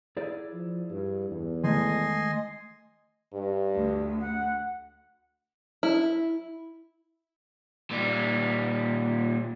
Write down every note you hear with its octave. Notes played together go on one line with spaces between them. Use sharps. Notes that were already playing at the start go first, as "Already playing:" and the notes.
E4 G#4 D5
F3
G2
E2
D#3 G#3 A3 D#5 G#5 C6
G2
D2
F#5
E4
A#2 G3